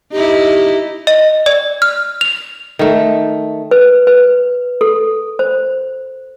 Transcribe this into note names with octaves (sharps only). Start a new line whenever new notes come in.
D#4 E4 G4
D#5
D5
F6
F7
D#3 A3
B4
B4
A4
C5